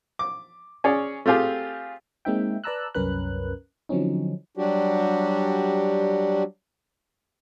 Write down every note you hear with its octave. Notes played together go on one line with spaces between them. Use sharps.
D6
C#4 G#4 C#5 D5
A3 C4 F4 G4 G#4
G#3 A#3 C4 D#4 E5 G5
B4 D5 A5 A#5 E6 F#6
C2 F#2 C#4 A#4 B4 F#6
D3 F3 F#3 C4 C#4 D#4
F#3 G3 D4 F#4 G4